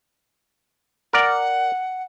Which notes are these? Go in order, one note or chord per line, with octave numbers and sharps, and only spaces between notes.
A#4 D5 F#5